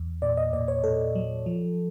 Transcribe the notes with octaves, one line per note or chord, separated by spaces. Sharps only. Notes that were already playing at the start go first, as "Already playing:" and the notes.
Already playing: E2
A#2 D5
D#5
A#2 D5
C#5
A#2 A4
F#3
F3